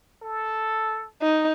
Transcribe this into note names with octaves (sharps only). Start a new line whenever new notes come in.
A4
D#4